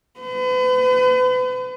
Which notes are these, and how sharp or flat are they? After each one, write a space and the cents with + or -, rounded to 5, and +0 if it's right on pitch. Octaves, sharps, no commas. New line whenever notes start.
B4 +40